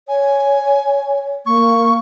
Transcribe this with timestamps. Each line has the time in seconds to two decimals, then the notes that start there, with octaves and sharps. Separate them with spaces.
0.08 C#5 G#5
1.46 A#3 C#6